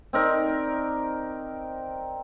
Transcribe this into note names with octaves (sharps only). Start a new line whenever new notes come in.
C4 D#4 A#4 D5